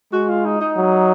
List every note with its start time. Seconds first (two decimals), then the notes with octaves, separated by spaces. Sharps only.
0.13 G#3 F#4
0.29 F4
0.45 D#4
0.61 D#4
0.77 F#3